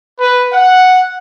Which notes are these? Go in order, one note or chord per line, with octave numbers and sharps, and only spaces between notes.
B4
F#5